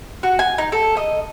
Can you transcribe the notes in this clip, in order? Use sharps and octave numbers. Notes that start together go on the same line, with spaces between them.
F#4
G#5
D#4
A4
D#5